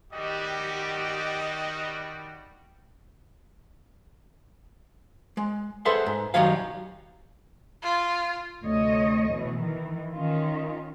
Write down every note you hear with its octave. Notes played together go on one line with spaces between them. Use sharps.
D#3 G3 F#4 G4 D5 D#5 G5
G#3
G#4 A4 B4 C5 E5 F#5
G#2
F#2 D#3 F#3 G3 C#5 F5
F4
D2 C3 C#5 D#5
B2 E3
D#3 E3
D#3 C#4 F4